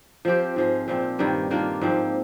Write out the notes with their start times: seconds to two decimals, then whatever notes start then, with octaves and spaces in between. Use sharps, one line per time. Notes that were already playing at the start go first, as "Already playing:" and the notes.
0.25 F3 C4 G4
0.56 G#2 F3 G#3
0.88 A#2 F3 C4
1.19 G2 D#3 G3 A#3
1.51 D#3 A#3 D4 F4
1.81 G#2 F3 C4